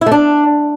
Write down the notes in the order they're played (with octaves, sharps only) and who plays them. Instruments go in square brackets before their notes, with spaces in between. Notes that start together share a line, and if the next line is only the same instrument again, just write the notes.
[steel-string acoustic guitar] E4
A3
D4